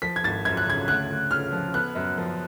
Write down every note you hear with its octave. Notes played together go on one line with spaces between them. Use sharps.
F3 B6
G#6
G#1 A6
F#2 G#6
F#6
C#3 G#6
D2 F#6
D2
C#3 F6
F3
B3 F#6
F#2
F3